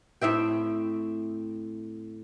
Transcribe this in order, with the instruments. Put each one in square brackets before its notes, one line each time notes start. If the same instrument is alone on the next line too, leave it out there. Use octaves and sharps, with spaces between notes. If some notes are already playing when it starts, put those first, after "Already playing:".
[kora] A2 C4 E5 G5